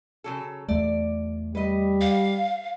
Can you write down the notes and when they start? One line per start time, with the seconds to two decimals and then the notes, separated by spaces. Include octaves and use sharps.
0.24 C#3 F#3 A4
0.69 E2 A3 D5
1.55 G3 B4 D#5
2.01 F5